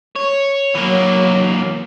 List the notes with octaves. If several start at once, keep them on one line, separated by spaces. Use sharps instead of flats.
C#5
E3 F#3 A#3